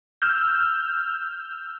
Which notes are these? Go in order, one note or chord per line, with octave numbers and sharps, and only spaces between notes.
E6 F6 G6